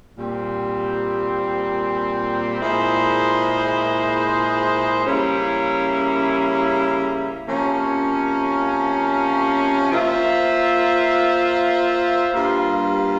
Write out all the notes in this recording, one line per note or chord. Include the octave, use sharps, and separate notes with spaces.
A#2 G3 C4
A#2 G#3 E4 G#4 C5
C#3 G3 A#3 C#4 E4
C3 F3 A#3 C#4
A#3 F4 C5 E5
G2 G3 A#3 F4